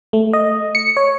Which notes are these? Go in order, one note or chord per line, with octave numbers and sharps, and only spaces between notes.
A3
D#5
C#7
C#5